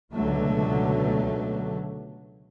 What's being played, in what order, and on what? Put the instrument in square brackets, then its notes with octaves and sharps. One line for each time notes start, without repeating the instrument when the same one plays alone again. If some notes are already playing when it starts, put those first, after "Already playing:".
[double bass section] C#2 B2 D3 F#3 A3